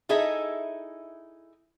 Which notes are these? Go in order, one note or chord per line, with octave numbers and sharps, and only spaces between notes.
D#4 E4 G#4 A4 D#5 E5